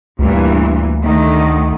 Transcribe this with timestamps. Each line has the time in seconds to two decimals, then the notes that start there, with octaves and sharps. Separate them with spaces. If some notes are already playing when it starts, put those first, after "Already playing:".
0.19 D2 G2 A#2 E3
1.00 D3 D#3 A3